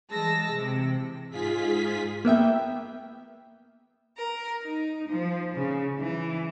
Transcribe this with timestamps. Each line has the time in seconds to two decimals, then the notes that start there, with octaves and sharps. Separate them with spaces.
0.12 E3 G3 G#3 A5 E6 A#6
0.51 C3 E3
1.30 G#2 F4 G#4 B6
2.25 A#3 B3 E5 G5
4.16 A#4
4.62 D#4
5.08 F3
5.54 C#3
5.99 E3